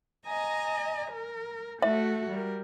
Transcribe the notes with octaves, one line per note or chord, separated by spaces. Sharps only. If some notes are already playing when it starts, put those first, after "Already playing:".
D#5 G#5 A#5
A#4
A3 F#4 A4 E5
G3 A#4